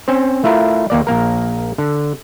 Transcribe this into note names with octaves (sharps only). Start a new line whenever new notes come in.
C4 C#4 C5
A3 E4 F4 A#4
D#2 A#3 D5
A#1 A#3 A#4
D3